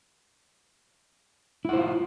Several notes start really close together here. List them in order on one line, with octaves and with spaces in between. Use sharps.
E4 F#5 C5 F4